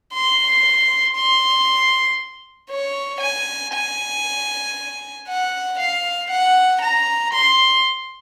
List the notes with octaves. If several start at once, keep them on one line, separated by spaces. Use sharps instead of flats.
C6
C6
C#5
G#5
G#5
F#5
F5
F#5
A#5
C6